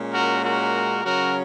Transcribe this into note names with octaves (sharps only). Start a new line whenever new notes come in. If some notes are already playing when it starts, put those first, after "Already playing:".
Already playing: A#2 G#3 C#4
F#4 A#4
F#4 A#4
C#3 F#3 C#4 F#4 A#4